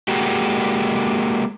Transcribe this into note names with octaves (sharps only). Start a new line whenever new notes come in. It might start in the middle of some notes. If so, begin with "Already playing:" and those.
G#3 A#3 F#4 G4